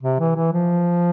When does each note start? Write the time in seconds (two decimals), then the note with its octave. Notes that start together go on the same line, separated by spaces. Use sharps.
0.03 C3
0.20 E3
0.36 E3
0.53 F3